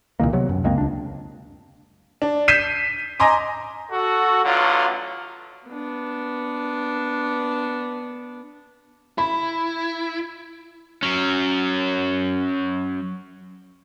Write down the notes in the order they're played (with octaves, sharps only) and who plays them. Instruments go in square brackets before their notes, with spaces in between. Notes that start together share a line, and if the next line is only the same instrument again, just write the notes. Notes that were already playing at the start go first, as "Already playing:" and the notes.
[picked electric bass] C2 A#2 D#3 A#3
C3 F#3 B3
F#2
C#2 G#3 A#3 C4
C#2 D4
[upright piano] D4
G6 B6 C7 D#7 E7
D#5 G#5 A#5 C6 D6
[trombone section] F#4 A4
A1 D3 F#3 F4
[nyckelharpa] B3 D4
[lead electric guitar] E4 [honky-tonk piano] B5
[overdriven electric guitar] F#3 C#4